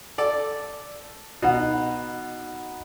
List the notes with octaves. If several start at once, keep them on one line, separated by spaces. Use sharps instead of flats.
A4 D5
B2 D#4 F#5